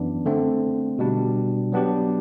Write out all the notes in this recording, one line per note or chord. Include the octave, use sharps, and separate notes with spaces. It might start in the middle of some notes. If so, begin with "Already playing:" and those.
Already playing: F#2 E3 B3 D4
D3 A3 C4
B2 G3 D4
F#3 B3 D4 G4